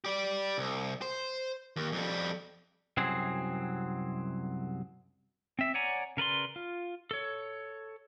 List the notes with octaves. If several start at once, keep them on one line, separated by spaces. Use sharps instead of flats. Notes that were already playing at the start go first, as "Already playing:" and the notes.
G4 D5
C2
C5
D#2
F2 G3
C2 F#2 F#3 C4 G#4
C4 E5
C#5 D5 F#5 G#5 A#5
C#3 A#4 B4 D5 C6
F4
A4 C#5